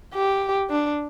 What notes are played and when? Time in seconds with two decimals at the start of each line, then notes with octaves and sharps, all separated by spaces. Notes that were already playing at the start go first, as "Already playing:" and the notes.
0.14 G4
0.70 D4